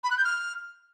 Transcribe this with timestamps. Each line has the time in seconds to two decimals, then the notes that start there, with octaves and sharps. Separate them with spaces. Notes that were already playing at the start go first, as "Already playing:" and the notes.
0.04 B5
0.10 F#6
0.17 G6
0.24 F6